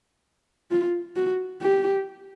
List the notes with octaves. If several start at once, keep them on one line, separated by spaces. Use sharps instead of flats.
F4
F#4
G4